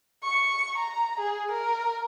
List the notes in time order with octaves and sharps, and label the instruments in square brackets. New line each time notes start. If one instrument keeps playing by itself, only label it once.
[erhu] C#6
A#5
G#4
A#4